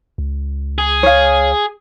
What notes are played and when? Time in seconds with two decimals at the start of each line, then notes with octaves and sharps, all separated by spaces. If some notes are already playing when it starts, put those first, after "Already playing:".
0.18 C#2
0.78 G#4
1.03 C#5 F5